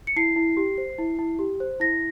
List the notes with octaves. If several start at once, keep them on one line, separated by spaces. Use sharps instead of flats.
C#7
E4 C7
E4
G4
C5
E4
E4
G4
C5
E4 A#6